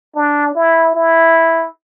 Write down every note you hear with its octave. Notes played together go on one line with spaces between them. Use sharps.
D4
E4
E4